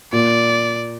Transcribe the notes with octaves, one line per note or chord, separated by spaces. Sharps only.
A#2 D5